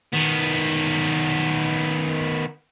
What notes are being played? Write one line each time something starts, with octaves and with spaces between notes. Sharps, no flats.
D#3 B3